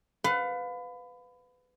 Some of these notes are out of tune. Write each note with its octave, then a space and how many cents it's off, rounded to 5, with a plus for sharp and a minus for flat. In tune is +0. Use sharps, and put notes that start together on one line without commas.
B4 +25 F5 +30